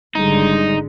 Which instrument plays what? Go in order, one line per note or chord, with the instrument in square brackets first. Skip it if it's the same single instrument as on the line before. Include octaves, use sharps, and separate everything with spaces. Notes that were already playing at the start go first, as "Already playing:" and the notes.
[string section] G#1 D3 G#3 [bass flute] G3 [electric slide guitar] D#4